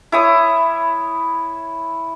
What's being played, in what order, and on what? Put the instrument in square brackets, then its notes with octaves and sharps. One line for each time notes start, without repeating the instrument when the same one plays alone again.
[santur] E4 C#5 D#6